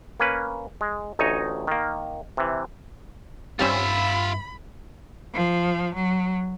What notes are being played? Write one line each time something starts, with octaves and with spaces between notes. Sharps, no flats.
A#3 C#4 B4
G#3
A1 D2 D#4 C#5 D#5 G#5
D#3 A#3
C3 E3
G2 G3 C4 C#4 F4 E5 B5
F3
F#3